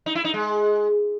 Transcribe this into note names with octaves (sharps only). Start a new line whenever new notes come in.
D#4
E4
D#4
G#3